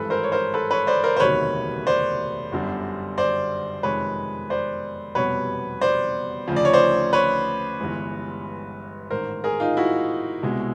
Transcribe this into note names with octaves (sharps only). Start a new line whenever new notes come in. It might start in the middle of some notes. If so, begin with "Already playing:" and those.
Already playing: G#1 G2 E3 G#3 A4 B4
A#4 C5
C#5
A#4 C5
A4 B4
B4 C#5
C5 D5
A#4 C5
C5
E1 D2 C3 D#3 F#3 B4 C#5
C5 D5
G1 F#2 D3 G3
C5 D5
F2 C3 D#3 G#3 B4 C#5
C5 D5
F1 E2 B2 G3 B4 C#5
C5 D5
D2 C#3 F3
D5
C#5
C5 D5
B4 C#5
G1 G2 E3 G#3
A1 G#2 D#3 A#4 C5
G#4 A#4
D#4 F4
E4 F#4
C2 B2 G#3